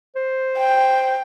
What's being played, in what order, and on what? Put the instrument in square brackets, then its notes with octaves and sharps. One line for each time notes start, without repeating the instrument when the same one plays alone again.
[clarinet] C5
[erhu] G5